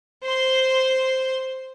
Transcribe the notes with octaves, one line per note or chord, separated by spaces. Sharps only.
C5 C6